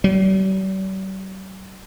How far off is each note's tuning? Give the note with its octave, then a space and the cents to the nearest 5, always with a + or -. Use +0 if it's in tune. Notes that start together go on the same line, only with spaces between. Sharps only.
G3 -45